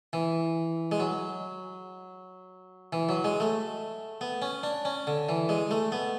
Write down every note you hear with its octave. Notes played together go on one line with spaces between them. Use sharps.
E3
G#3
F#3
E3
F#3
G#3
A3
B3
C#4
D4
C#4
D3
E3
G#3
A3
B3